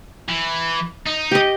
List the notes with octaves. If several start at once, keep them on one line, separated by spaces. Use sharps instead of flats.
E3
D#4
G4 D#5